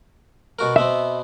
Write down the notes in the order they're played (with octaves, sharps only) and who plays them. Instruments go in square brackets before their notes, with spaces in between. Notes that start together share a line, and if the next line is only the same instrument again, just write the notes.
[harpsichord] B2 F#4 A#4
[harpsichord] B2 B3 C4 [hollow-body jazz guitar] E5